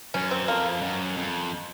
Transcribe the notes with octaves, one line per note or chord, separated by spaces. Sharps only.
F#2 C#4
C4
F2 A#3
F#2
F2